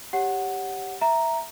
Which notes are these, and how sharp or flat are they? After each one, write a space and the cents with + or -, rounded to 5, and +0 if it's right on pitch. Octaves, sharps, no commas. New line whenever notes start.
G4 +0 C#5 +0 F#5 +0
E5 +0 A#5 +0